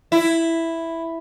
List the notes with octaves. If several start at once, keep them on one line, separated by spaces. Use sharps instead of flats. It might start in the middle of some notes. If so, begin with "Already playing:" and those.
E4